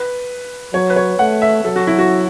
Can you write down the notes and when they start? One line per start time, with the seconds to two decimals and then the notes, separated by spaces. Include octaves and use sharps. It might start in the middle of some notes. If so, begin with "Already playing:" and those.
Already playing: B4
0.74 F#3 C#5
0.90 B4
0.96 C#5
1.19 A3 F#5
1.42 E5
1.64 F#3 A4
1.76 F#4
1.87 E4
1.99 F#4